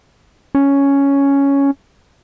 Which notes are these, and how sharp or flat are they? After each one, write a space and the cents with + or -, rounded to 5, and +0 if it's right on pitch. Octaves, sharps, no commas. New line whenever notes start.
C#4 +5